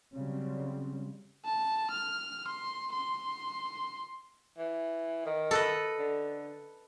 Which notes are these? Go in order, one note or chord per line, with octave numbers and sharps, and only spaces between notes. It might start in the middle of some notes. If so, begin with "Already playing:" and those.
C#3 F#3 G3 C4
A5
F6
C6
C6
E3
D#3
A4 B4 D#5
D3